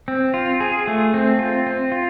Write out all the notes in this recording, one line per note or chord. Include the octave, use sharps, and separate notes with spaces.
C4
F4
G#4
A3
C4
F4
C4
F4